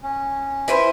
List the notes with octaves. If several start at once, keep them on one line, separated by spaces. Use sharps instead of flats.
C#4
E4 B4 C5